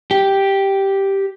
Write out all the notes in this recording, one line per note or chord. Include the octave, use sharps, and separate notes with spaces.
G4